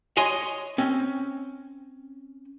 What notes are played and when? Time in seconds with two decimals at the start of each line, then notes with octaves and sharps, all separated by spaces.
0.17 C#5 D#5 G#5 C6
0.78 C4 C#4